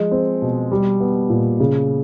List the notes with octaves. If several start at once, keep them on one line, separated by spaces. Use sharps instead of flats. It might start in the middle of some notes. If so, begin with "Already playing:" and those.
Already playing: F3 G#3
C4
B2
G3
B3
A#2
C#3